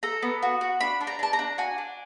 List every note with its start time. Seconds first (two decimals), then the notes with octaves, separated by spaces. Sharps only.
0.03 A4 A#5
0.22 B3
0.42 F#4
0.61 F#4
0.80 D4 B5
1.01 D4
1.07 A#5
1.19 D4 A5
1.33 A#5
1.39 D4
1.58 F#4 G#5
1.78 D4